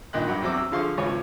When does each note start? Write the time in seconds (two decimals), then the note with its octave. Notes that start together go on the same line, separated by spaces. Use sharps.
0.13 G2 A#2 D#3 D#5 C6 F#6
0.27 G2 F#3 F#5 G5 D6
0.42 E2 F#3 C4 D6 E6
0.57 E6
0.72 D3 F3 G#4 F5 C6 C#6
0.98 G#1 C#2 F4 C#5 G#5